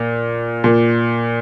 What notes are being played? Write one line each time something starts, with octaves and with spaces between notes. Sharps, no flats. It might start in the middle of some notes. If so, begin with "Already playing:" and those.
Already playing: A#2
A#2